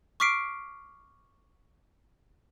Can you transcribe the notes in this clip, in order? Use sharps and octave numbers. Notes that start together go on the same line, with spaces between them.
C#6 D6 F6 B6 C7 D7